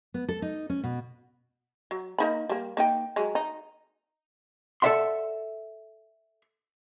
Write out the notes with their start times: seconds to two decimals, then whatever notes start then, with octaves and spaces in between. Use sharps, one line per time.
0.14 B3
0.29 A4
0.42 D#4
0.70 C#4
0.84 B2
1.91 F#3
2.18 A#3 D#4 B5
2.49 G3 A#3
2.77 A#3 D#4 G5
3.16 F#3 G#3
3.35 D#4
4.82 A4 B4 D5 E5 F#5 C6